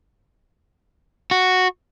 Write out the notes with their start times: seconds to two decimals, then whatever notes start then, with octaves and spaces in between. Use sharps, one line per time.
1.31 F#4